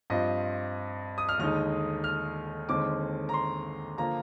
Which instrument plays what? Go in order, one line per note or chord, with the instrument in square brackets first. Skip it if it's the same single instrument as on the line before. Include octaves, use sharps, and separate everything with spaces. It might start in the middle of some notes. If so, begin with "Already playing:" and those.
[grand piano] G2 F3 C4 F4 D#5
D#6
F6
D#2 D3 G#3 D#4 F6
F6
D#2 D3 G#3 C4 D#4 D6
A#5
C6
D3 F3 A#3 F4 A#5